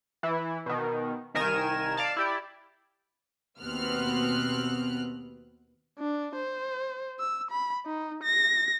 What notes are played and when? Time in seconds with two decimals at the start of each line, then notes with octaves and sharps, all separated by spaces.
0.23 E3 E4
0.66 B2 D#3
1.34 C2 D#3 A#4 G#5 E7
1.97 D5 F5 A5
2.17 E4 G4 D5
3.61 D#2 B2 B3 C4 F6 F#6
5.99 D4
6.35 C5
7.19 E6
7.51 B5
7.86 D#4
8.23 A#6